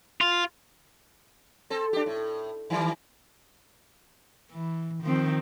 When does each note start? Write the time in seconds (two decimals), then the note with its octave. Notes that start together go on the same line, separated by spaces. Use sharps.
0.21 F4
1.70 C4 A4
1.93 D4 G4
2.06 A2
2.70 D#3 E3 G3
4.51 E3
5.03 D#3 F3 C4